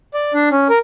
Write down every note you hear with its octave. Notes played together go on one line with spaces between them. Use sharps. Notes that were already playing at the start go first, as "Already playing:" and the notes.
D5
D4
C#4
A#4